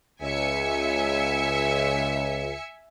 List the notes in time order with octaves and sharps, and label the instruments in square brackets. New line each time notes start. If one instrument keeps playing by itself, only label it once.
[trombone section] C#2 [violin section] E5 G#5 C#7